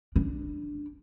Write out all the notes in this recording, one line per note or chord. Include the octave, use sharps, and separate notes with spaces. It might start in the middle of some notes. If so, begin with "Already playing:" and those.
D4